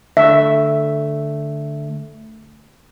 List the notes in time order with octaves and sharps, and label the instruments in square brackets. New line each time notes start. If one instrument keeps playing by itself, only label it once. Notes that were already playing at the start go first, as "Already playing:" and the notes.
[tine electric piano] D3 A3 [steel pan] E5